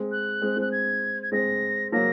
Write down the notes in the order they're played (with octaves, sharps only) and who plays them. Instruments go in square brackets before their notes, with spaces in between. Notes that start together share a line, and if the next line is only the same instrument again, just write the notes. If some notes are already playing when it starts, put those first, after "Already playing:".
Already playing: [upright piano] G#3 C4
[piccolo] F#6
[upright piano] G#3 C4
G#3 C4
[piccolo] F#6
G#6
G#6
[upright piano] G#3 C4 [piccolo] A#6
[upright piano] F#3 A#3 [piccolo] A#6